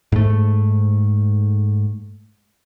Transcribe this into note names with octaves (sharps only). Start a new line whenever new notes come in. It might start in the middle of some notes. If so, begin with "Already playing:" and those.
G#2 A3